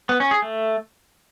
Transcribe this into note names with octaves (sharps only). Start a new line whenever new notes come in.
B3
C#4
G#4
A3